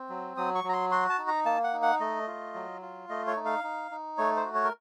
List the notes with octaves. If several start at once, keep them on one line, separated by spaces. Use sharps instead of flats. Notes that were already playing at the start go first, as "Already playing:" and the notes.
Already playing: C4
F#3
F#3 D#6
C#6
F#3
A#5
C6
F#4 C6
A5
D#4
A#5
A#3 A5
F#5
D#4
F#5
A3 D#5
F4
F#3
F4
A3 D#5
C#5
D#4
F5
D#4
D#4
A3 C#5
C5
F#4
C#5
A#4